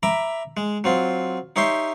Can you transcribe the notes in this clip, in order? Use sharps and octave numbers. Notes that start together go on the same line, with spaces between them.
E5 A#5 B5 D6
G#3
F#3 C4 F4
D#4 G4 C#5 E5 C6